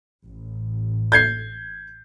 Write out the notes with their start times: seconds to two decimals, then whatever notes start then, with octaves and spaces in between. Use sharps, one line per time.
0.25 A1
1.12 G6 G#6 C7